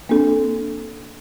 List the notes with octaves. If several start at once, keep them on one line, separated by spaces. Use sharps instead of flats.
A#3 C4 D4 A4